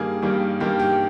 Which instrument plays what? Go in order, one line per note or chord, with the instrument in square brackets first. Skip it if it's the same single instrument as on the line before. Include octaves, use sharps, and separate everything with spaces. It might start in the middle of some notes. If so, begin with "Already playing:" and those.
Already playing: [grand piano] G2 D#3 G3 A#3 G#4
G2 D#3 G3 A#3
G2 D#3 G3 A#3 G4
G4